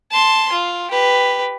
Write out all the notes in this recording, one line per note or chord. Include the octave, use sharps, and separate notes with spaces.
A5 C6
F4
G4 B4